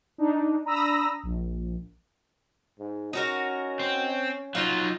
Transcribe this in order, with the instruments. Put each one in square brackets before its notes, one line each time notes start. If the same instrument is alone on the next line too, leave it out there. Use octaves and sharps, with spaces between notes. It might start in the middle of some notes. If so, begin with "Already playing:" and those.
[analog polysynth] D4 D#4
D4 A#5 B5 D#6 E6 A#6
A#1
[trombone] G#2
[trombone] C#4 [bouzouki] D#4 F#4 A#4
[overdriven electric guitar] C4
[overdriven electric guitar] F#3 D#4 [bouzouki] F4